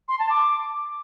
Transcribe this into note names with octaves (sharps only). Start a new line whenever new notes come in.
C6
A5
D6